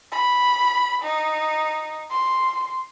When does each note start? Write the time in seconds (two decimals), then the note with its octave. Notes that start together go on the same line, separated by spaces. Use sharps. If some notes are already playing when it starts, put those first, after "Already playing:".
0.12 B5
1.03 D#4
2.11 C6